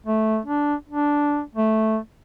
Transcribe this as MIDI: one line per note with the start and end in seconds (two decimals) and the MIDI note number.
0.06 0.39 57
0.46 0.75 62
0.89 1.41 62
1.55 1.98 57